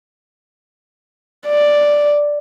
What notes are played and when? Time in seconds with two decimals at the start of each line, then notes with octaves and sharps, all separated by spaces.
1.47 D5